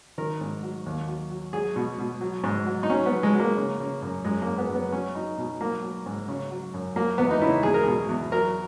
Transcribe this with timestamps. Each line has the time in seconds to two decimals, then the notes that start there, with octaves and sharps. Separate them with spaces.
0.18 D#3 A#4
0.41 G#2
0.63 F#3
0.86 D#2
1.08 F#3
1.31 F#3
1.53 F#3 G#4
1.76 B2
1.99 B2
2.21 F#3
2.44 G#2
2.66 F#3
2.83 D#4
2.89 F#3 C#4
3.06 B3
3.12 F#3
3.23 G#3
3.34 F#3
3.39 A#3
3.57 C#3
3.80 C#3
4.02 F#2
4.25 F#2 G#3
4.42 F#2 A#3
4.58 B3
4.69 F#2
4.75 B3
4.92 F#3 C#4
5.15 F#3 D#4
5.38 B2
5.60 F#3 A#3
5.82 F#3
6.06 G#2
6.28 C#3
6.51 F#3
6.74 F#2
6.96 F#3 A#3
7.18 E2 B3
7.31 D#4
7.41 C#3 E4
7.63 E2 G#4
7.74 A#4
7.83 B2 G#4
8.09 E2
8.31 F#3 A#4